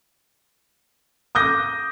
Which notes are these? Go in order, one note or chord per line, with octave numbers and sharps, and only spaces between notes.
D6 D#6 G6 A#6